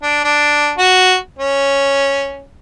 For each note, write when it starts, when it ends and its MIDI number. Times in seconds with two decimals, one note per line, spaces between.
0.03 0.22 62
0.25 0.72 62
0.78 1.15 66
1.39 2.44 61